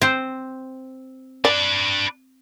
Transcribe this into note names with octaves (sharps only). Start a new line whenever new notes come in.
C4 C5
D4 B4 D5